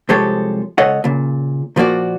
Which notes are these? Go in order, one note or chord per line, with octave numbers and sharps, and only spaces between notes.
C2 F3 G#3 G4 A4 C#5
C#2 A4 C#5 D#5 F#5
A#2 C#3
A#2 F3 A#3 F#4 D5